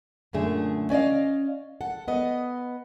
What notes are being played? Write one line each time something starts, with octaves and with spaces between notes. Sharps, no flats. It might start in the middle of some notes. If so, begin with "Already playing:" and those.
F#2 A#2 D3 A3 G#4
C#4 D5 D#5 F5
A4 F#5
B3 D#5